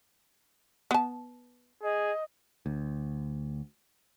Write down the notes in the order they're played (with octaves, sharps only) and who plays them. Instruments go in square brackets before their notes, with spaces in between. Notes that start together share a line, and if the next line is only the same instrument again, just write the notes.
[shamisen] B3 A5
[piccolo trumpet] G#4 [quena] D#5
[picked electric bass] D2